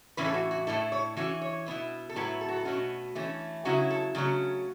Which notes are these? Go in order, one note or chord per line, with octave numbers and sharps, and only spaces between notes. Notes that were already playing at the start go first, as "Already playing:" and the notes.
A2 E3 C#4 E4 B4
A4
F#4
F#4
A2 A3 E4 A4
C#5
E3 C#4 E4 F#4
C#5
B2 B3 E4
A4
A2 F#3 B3 E4 B4
A4
F#4
A4
B2 A3 C#4 F#4
E3 A3 C#4
C#3 F#3 C#4 E4 F#4
A4
C#3 F#3 A3 C#4